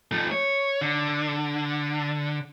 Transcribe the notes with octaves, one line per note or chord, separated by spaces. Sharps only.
F3 A3
C#5
D3